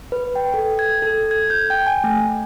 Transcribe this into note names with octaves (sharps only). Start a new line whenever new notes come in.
B4
G5
A4
G#6
A4
G#6
G6
G5
G#5
A3